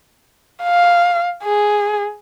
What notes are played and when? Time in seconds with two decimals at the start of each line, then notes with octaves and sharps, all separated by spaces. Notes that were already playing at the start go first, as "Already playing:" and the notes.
0.63 F5
1.44 G#4